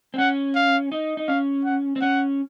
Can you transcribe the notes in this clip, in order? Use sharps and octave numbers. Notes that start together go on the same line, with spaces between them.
C4
C#4 F#5
F5
D#4
D#4
C#4 F5
F#5
C4
C#4 F#5